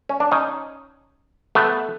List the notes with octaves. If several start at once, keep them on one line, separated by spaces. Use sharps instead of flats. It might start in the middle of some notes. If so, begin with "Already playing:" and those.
C#4
D4
C#4 D#4
A3 B3